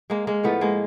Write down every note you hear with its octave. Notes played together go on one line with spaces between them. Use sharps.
G#3 A#3
G#3 A#3
A2 F3 A3 B3
G#3 A#3